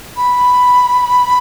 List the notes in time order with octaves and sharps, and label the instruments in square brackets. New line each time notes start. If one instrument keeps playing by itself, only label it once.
[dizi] B5